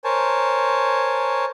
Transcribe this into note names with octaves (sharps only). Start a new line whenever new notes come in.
A#4 C5 C#5 G#5 A5